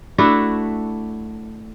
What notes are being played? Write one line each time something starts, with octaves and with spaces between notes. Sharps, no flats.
A3 D4 E4 F#4